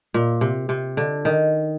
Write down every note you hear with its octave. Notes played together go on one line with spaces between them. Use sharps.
A#2
C3
C3
D3
D#3